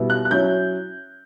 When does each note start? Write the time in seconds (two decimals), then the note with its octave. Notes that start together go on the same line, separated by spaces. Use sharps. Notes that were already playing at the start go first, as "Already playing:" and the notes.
Already playing: B2 G3 B3 E4
0.10 F#6
0.25 F#6
0.31 F#3 C#4 E4 G6